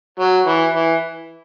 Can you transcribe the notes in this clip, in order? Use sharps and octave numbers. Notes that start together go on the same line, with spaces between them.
F#3
E3
E3